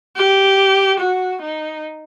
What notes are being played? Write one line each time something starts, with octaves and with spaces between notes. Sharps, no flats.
G4
F#4
D#4